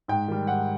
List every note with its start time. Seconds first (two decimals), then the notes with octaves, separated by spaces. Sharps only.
0.08 G#2 G5
0.28 D#3 G3
0.47 G#2 F#5